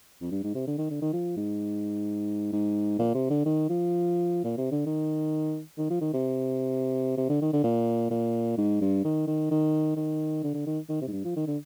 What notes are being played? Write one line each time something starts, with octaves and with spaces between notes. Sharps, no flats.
F2
G2
G#2
C3
D3
D#3
D3
D#3
F3
G#2
G#2
A#2
C3
D3
D#3
F3
A#2
C3
D3
D#3
D#3
F3
D#3
C3
C3
D3
D#3
D3
A#2
A#2
G#2
G2
D#3
D#3
D#3
D#3
D3
D3
D#3
D#3
C3
G#2
G2
F3
D#3
D3